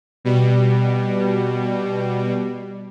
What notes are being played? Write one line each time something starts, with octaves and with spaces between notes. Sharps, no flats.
B2 G3